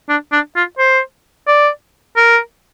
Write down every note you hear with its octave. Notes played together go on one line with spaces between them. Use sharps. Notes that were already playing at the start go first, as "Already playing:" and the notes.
D4
D4
F4
C5
D5
A#4